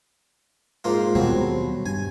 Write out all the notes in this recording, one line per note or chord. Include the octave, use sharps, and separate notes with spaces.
G#2 A#3 F4
D#2 B2 F#3 G3 C4
G2 G#5